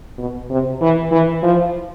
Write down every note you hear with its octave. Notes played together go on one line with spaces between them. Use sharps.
B2
C3
E3
E3
F3